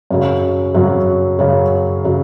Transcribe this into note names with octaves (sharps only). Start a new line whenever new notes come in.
F#2 C#3 F#3
F#2 C#3 F#3
F#2 C#3 F#3
C#3 F#3